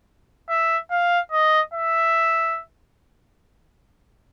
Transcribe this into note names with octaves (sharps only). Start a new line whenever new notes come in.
E5
F5
D#5
E5